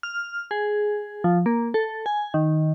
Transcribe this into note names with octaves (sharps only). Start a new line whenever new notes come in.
F6
G#4
F3
A#3
A4
G#5
D#3